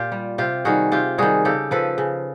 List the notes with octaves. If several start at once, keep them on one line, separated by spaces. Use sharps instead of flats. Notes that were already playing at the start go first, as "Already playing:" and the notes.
Already playing: A#2 F4 G4
G3
C3 F4 G4
D#3 G3 F#4 G#4
C3 F4 G4
D#3 G3 F#4 G#4
C#3 G4 A4
F3 A4 B4
C#3